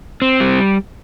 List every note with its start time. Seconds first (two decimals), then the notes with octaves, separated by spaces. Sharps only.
0.22 C4
0.40 G3